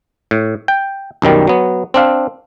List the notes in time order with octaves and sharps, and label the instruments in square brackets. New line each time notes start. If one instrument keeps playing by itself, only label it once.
[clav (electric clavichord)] A2
G5
B1 F#2 D#3 G3
F#3 B3
C4 D4 F5